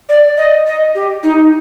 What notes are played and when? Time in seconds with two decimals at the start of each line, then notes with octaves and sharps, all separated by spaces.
0.09 D5
0.37 D#5
0.66 D#5
0.95 G4
1.23 D#4